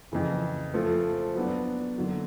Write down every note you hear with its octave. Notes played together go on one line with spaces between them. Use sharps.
F2 C#3 E3
F3 A3 C4 F4 A4
F#3 B3 D4
D3 F#3 A#3